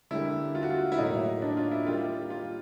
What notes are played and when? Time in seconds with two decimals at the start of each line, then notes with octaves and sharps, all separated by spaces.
0.11 D3 G3 A#3 E4
0.55 F4
0.63 F#4
0.70 F4
0.92 E4
0.98 A2 F#3 A#3 D#4
1.42 D4
1.57 F4
1.71 E4
1.86 D#3 G3 A#3 F4
2.30 F4